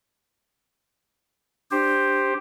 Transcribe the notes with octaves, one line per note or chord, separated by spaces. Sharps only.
D4 G4 C5